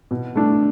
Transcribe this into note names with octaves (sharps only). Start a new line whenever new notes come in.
B2
A3 D4